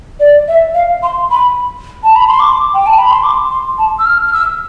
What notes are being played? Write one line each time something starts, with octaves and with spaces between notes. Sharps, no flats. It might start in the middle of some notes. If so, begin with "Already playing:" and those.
D5
E5
F5
C6
B5
A5
B5
C6
D6
G5
A5
B5
C6
D6
C6
A5
E6
F6
F6
E6